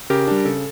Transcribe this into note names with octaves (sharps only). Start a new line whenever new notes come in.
C#3 G4 A#4
G3 D4
C#3 A4